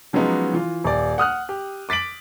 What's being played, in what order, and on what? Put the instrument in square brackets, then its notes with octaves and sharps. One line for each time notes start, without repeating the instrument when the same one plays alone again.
[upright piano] F3 F#3 G#3 B3 C#4 D#4
E3 F4
D#1 D5
F#5 D#6 F6 F#6
G4
D6 A6 B6 D7 F#7